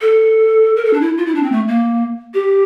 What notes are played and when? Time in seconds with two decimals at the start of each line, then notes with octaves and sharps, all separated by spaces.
0.01 A4
0.76 A#4
0.85 A4
0.93 D4
1.01 E4
1.18 F4
1.26 E4
1.35 D4
1.43 C4
1.52 A3
1.68 A#3
2.34 G4